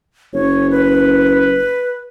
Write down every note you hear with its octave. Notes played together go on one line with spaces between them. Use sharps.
F#1 C#5
B4